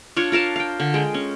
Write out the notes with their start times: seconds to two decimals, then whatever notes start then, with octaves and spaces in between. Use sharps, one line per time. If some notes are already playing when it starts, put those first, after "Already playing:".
0.17 D4 F4 C#5
0.32 F4 A#4 F5 A5
0.56 F5 G5
0.80 D3
0.94 G#3 G5
1.14 C#4